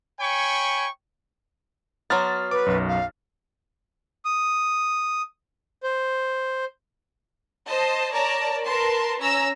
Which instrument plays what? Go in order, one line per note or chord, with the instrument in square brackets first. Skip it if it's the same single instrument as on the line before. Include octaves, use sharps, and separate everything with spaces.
[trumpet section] C#5 G5 G#5 B5 C#6
[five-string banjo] F#3 B3 [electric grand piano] C6 F6 A6
[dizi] B4 [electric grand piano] D6
[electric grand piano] B1 F#2
[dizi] F5
[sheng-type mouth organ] D#6
C5
[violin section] C5 D#5 A5
A#4 C#5 D5 A5 A#5
A#4 B4 A5 C6
C#4 A#5 E6